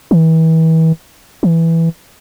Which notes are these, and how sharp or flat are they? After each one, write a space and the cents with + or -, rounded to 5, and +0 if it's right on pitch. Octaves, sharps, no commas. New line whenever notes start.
E3 -35
E3 +0